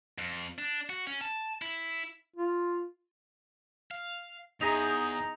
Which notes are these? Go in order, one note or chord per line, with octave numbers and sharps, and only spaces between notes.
F2
D4
F#4
C#4
A5
E4
F4
F5
E2 D#4 G#4 A#5 A#6 F7